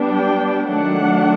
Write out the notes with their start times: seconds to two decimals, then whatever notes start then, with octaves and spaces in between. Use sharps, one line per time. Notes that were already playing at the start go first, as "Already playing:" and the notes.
Already playing: G3 B3 D4
0.09 G5
0.68 D#3 F#3 A3 D4 F#5